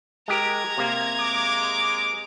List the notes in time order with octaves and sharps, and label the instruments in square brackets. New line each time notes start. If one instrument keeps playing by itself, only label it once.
[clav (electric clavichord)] G#3 G4 A#4 [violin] A#5 G#6
[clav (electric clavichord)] C3 A#3
[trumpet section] G#3 D6